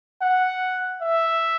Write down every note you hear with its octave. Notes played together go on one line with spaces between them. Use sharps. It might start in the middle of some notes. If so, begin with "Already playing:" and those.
F#5
E5